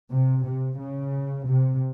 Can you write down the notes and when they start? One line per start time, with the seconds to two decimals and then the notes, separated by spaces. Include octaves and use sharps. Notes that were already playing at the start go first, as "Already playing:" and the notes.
0.11 C3
0.45 C3
0.79 C#3
1.47 C3